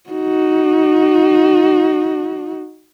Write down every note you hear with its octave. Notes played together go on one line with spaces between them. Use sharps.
D#4 F#4